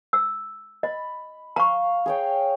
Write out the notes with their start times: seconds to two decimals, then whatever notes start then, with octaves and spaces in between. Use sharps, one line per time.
0.13 E6
0.83 D#5 B5
1.56 F5 A#5 C#6
2.06 G#4 C#5 G5